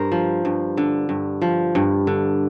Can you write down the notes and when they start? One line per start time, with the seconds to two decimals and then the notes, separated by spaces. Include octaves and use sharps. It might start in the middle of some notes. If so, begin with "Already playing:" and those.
Already playing: G2 A#4 C5
0.12 F3
0.45 G2
0.77 D3
1.09 G2
1.42 F3
1.75 G2
2.07 D3